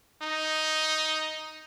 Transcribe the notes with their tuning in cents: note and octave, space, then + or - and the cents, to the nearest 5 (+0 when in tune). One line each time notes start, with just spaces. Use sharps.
D#4 +5